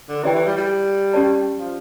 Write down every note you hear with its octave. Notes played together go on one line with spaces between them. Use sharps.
D3
E3 E4 G4 D5 G5
E3
G3
G3
C#4 G4 D5 A5
F3